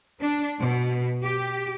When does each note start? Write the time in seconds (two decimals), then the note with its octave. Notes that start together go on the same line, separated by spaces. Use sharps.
0.20 D4
0.59 B2
1.22 G4